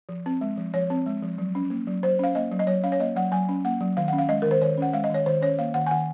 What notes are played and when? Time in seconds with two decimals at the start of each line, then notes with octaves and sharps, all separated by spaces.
0.09 F3
0.26 C4
0.41 G#3
0.57 F3
0.74 F3 C#5
0.90 C4
1.06 G#3
1.22 F3
1.38 F#3
1.55 C#4
1.70 A#3
1.87 F#3
2.03 F#3 C5
2.19 C#4 F5
2.35 A#3 D#5
2.52 F#3
2.59 D#5
2.67 F#3 C#5
2.84 C#4 F5
2.92 C#5
3.00 A#3 D#5
3.16 F#3 F#5
3.32 F#3 G#5
3.49 C#4
3.65 A#3 F#5
3.81 F#3
3.97 D#3 F5
4.08 C#4 F#5
4.18 F5
4.29 G#3 D#5
4.42 D#3 A#4
4.51 C5
4.61 D#3 C#5
4.78 C#4 F#5
4.93 G#3 F5
5.04 D#5
5.10 D#3 C#5
5.26 D#3 C5
5.41 C#4 C#5
5.59 A#3 F5
5.74 D#3 F#5
5.87 G#5
5.91 D#3 F#5